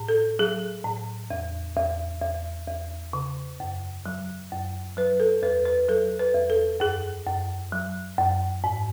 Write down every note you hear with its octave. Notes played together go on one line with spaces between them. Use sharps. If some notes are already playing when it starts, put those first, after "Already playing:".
Already playing: A2
A4
F#3 G#4
A2
E2
E2
E2
E2
C#3
F#2
F#3
F#2
F#3 B4
A4
E2 B4
B4
F#3 A4
B4
E2
A4
F#2 G#4
F#2
F#3
F#2
G#2